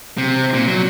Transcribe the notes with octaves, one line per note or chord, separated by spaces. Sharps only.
C3
A#2
F#3